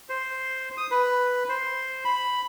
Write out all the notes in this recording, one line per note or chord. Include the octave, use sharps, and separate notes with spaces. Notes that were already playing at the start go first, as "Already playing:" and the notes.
C5
D#6
B4
C5
B5